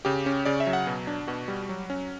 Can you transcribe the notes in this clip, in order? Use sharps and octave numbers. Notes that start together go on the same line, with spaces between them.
C#3 G4
C#4
C#3 D5
E5
F#3
F#5
B2
D4
B2 F#4
G3
F#3
C#4